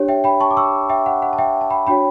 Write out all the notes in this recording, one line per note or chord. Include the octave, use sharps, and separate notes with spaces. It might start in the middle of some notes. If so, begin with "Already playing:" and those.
Already playing: D4 G4 C#5
E5 G5
G5 B5
A5 C#6
D6
C#6 E6
E5 G5
F#5
F#5
A5
E5 G5
A5
G5 B5
D4 F#4 C#5 G5 B5